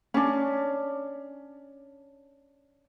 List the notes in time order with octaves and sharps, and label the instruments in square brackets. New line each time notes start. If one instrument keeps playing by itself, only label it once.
[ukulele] C#4 D4